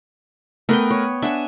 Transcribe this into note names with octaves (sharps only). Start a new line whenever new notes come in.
A3 B3 A#4 B4 G5
C#5
D4 E5 F#5 G#5